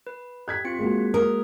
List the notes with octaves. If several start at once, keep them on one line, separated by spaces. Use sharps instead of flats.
B4
G4 F#6 G#6 B6
C4 F4 C#7
G#3 A#3 F#4
A#4 D#6